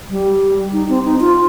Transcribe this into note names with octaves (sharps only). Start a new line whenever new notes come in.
G3
D#4
C4
D#4
F4